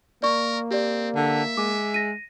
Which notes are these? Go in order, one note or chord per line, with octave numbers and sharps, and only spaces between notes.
A#3 A#4 D5 C#6
C4 G4 D5
D3 E5
G#3 D6
A#6 D#7